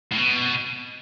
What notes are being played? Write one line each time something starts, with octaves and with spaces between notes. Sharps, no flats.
A2
B2